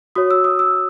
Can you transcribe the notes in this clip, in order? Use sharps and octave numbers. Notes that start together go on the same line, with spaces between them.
F#4 C#5 D#6
E6
D#6
E6